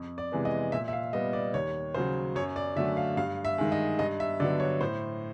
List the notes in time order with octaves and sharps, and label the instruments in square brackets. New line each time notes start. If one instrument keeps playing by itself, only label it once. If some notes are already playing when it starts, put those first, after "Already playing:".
Already playing: [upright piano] F2
D5
C3 E3 G#3 B3
D#5
A#2 E5
E5
F5
G3 B3 D#5
D5
D#2 C#5
C#3 F#3 C5
F#2 C#5
D5
D3 F#3 A3 E5
F5
G2 F5
E5
D#3 G#3
D#5
G2 D#5
E5
D3 F#3 B3 D5
C#5
A2 C5